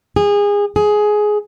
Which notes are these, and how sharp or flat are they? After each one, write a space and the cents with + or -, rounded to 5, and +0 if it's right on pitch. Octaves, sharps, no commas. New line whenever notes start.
G#4 -25
G#4 +15